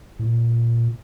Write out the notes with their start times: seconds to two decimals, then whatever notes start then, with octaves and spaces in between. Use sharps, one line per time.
0.19 A2
0.26 A#2